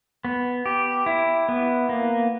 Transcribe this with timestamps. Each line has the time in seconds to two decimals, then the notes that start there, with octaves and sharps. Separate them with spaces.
0.25 B3
0.66 G4
1.06 E4
1.49 B3
1.89 A#3